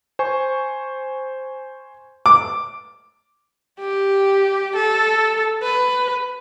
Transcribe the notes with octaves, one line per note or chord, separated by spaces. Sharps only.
C5 G#5 C#6
D6
G4
A4
B4